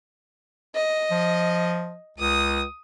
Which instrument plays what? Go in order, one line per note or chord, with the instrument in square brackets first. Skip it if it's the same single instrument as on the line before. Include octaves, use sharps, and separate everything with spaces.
[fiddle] D#5
[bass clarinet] F3
[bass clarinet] C#2 [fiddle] D#6